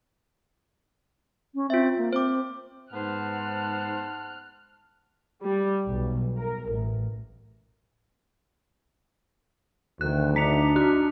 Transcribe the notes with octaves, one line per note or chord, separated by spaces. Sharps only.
C#4
C4 F4 E5
A#3
C4 C5 D6
G#2 B3 C5 F#5 A5 F6 F#6
G3
B1
A#4
A1
D2 D#3 F#6
D4 D#4 A#5 B6 C#7 F7
F#4 F#6